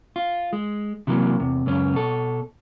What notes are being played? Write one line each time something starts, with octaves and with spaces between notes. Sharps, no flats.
F4
G#3
C3 E3 F#3 A#3
E2 C3
C#2 F#2 C#4
B2 A4